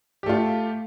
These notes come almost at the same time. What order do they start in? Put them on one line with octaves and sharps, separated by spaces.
G4 A3 F4